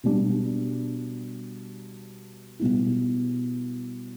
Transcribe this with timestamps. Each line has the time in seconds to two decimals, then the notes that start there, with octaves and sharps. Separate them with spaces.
0.04 B2 G3 D4
2.60 B2 G3 B3 E4